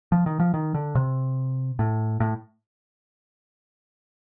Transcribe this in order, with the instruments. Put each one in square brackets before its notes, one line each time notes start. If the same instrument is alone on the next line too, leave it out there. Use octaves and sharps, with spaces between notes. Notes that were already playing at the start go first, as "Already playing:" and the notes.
[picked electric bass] F3
D#3
F3
D#3
D3
C3
A2
A2